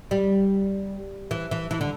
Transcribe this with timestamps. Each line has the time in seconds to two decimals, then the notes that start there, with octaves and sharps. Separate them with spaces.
0.11 G3
1.31 E3
1.51 E3
1.71 E3
1.81 D3